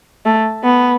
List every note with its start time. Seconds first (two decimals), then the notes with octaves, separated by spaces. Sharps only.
0.26 A3
0.64 B3